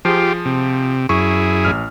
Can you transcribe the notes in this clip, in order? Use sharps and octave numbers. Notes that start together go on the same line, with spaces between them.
F3 F4 G4 G#4
C3
F#2 E4 G#4 C#6
A1 F6